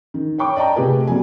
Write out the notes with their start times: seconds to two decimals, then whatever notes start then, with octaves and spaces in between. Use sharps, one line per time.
0.14 D#3
0.38 C#5 G5 C#6 D6
0.56 D5 D#5 G5 A5 A#5
0.76 C3 A3 F4 G4 G#4 B4
1.07 B2 F#3 G3 G#5